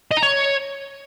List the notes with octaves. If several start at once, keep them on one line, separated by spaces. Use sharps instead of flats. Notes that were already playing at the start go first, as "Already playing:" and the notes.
D#5
A#5
C#5